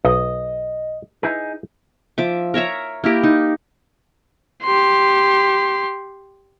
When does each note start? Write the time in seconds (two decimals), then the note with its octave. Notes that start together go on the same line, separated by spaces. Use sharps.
0.05 B1 D#5
1.23 D#4 E4 G#4 B4
2.18 F3 E5 D6
2.54 A#4 C#5 E5 A#5
3.04 A#3 E4 G4 A#4
3.23 D#4
4.64 G4 C6